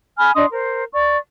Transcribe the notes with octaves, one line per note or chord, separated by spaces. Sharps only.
G#5 B5 F6
D4 D#5 C6 D#6
A#4 C5
D5 C#6